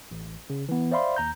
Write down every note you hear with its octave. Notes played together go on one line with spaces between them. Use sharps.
A1
C#3
E3 B3
C5 D5 E5 F5 B5 C6
D#2 A#5 G6